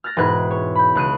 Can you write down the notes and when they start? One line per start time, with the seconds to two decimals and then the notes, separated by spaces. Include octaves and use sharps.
0.04 F6 F#6 A6 A#6
0.17 E1 G#2 B4 F#6 G#6
0.51 C#5
0.75 B5 G6
0.95 C#2 F#6 D#7